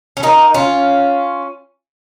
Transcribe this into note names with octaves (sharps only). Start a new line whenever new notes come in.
C#4
A#3 D#4
C#4 F4